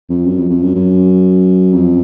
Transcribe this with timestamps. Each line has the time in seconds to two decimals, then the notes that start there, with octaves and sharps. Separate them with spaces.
0.09 F2
0.26 F#2
0.38 F2
0.50 F2
0.62 F#2
0.75 F#2
1.73 F2